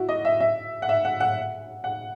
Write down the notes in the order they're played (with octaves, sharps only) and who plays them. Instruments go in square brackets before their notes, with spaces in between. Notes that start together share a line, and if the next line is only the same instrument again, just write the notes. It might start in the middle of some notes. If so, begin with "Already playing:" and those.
Already playing: [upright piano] E4 F#4
D#5
E5
E5
F#5
E5
F#5
F#5
F#5